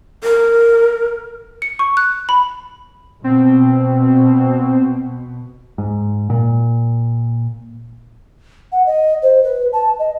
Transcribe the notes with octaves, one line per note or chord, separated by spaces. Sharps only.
A#4
C#7
C#6
F#6
B5
B2 C4
G#2
A#2
F#5
D#5
C5
B4
A5
D#5